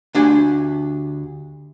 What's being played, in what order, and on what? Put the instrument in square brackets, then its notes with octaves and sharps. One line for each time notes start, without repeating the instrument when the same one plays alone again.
[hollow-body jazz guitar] D2 D4 G4 G#5